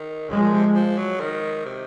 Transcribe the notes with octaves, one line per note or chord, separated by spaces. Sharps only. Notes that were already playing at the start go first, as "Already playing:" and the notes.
Already playing: D#3
C#3 F3 G#3
A#2
C3
F3
F#3
D#3
C3